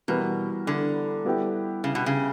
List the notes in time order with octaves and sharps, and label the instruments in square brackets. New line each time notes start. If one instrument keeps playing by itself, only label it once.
[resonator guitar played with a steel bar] B2 [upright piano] E3 G3 B3 F#4 A#4
[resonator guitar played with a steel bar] D3
[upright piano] G3 B3 E4 G4
[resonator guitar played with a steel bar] C#3
B2
C#3